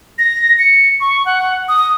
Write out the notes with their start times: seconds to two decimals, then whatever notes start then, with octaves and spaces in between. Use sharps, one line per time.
0.18 A#6
0.59 C#7
1.01 C#6
1.26 F#5
1.68 D#6